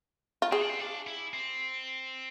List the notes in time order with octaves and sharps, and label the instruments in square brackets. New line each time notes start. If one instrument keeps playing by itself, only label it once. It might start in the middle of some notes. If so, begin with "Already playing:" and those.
[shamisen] F4
[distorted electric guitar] C4 [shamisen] G#4
[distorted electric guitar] D4
C4
D4
E4
C4